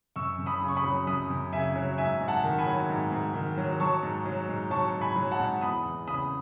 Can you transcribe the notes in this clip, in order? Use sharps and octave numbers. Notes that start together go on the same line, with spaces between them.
F#2 C#6 E6
F#2
B5 D#6
C#3
C#6
B5 D#6
F#3
F#2 B5 D#6
F#2
C#3 E5 G#5
F#3
G#2 E5 G#5
G#2
F#5 A5
D#3
G#5 B5
F#3
G#2
G#2
D#3
F#3
F#3 A5 C#6
G#2
F#3
G#2
F#3 A5 C#6
G#2
G#5 B5
F#3
F#5 A5
G#2
E2 B5 D#6
E2
C#3 B5 D#6